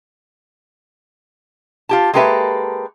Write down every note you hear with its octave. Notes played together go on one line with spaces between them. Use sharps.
F4 G4 A5
G#3 A#3 G4 A4 B4 E5